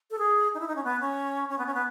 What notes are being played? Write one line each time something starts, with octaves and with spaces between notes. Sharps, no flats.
A4
G#4
D#4
E4
D#4
C#4
B3
C#4
C#4
B3
C#4
B3